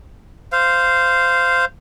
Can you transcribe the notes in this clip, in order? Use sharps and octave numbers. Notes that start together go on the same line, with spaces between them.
C5 F5